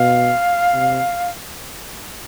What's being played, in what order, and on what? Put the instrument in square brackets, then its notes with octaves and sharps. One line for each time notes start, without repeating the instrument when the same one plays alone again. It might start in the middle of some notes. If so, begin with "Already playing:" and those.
Already playing: [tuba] B2 [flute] F5
[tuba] C3